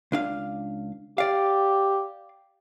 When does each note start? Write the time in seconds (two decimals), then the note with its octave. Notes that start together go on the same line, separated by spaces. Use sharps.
0.12 C#2 D4 F5
1.18 G4 D5 F5